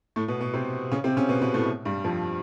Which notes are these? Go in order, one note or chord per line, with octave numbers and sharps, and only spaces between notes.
A2 A3
B2 B3
B2 B3
C3 C4
C#3 C#4
C3 C4
C#3 C#4
B2 B3
B2 B3
A2 A3
G2 G3
F2 F3